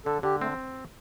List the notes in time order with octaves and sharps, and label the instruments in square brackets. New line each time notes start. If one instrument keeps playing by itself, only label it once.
[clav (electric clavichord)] D3 [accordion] A4
[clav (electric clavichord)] D3 [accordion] G4
[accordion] A3 [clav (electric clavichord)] C4